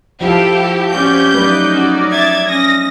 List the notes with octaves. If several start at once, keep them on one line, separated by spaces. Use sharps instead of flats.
F3 E4 F4 G4 A4 F5
C4 C#4 F#4 G4 D5 G6
F#3 A3 D#4 B4 D5
C#4 F#4
E5 G#6 A6
C#4 D#6 A#6